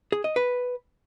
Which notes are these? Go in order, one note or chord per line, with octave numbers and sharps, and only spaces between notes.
G#4
D#5
B4